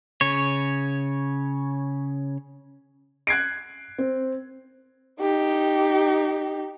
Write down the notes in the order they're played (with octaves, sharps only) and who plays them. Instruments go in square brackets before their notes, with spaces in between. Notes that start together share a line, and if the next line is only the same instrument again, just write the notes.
[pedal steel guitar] C#3 C#5
[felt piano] F#6 G#6 C7 D7
C4
[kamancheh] D#4 G4